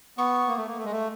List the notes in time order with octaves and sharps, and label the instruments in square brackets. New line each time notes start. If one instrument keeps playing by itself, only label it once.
[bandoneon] B3 [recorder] C#6
[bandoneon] A#3
A3
A#3
A3
G#3
A3